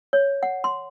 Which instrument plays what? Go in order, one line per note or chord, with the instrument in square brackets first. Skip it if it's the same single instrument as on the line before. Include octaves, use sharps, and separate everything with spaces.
[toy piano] C#5
F#5
C6